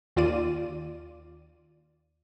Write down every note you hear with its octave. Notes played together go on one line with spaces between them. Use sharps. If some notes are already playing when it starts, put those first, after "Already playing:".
D#2 F4 D5 D#7